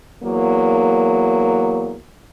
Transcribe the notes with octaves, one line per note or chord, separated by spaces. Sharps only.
E2 F#3 A#3